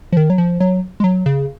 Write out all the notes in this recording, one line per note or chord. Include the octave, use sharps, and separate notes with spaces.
F3
D#3
F#3
F3
F#3
G#3
F#3
C#3